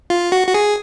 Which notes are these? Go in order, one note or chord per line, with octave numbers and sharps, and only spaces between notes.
F4
F#4
F#4
G#4